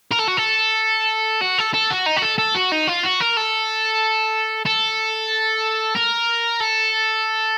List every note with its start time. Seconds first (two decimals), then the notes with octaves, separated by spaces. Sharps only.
0.12 A#4
0.20 A4
0.28 F#4
0.37 A4
1.41 F#4
1.58 A4
1.74 A4
1.90 F#4
2.06 D#4
2.16 F#4
2.22 A4
2.38 A4
2.55 F#4
2.72 D#4
2.87 F4
3.04 F#4
3.20 A#4
3.37 A4
4.66 A4
5.95 A#4
6.60 A4